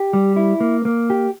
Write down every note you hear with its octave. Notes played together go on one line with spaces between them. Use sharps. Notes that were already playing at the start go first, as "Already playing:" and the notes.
Already playing: G4
G3
E4
A#3
A#3
G4